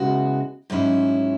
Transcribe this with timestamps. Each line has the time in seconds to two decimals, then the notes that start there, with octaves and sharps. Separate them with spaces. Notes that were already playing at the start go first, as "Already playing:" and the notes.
Already playing: C#3 G#3 B3 E4 F#4
0.70 G#2 F#3 C#4 E4